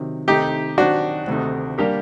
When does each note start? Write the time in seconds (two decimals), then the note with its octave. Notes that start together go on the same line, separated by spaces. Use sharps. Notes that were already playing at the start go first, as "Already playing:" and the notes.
Already playing: C3 D#3 F#3
0.28 C3 D#3 A3 D#4 G4
0.78 D#3 F#3 C4 D4 F#4
1.27 D2 C3 D#3 A3 D#4
1.78 G3 A#3 D4 G4 A#4